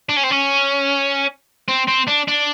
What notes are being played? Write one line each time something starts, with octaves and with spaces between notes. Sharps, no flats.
D4
C#4
C4
C#4
C4
C4
D4
D4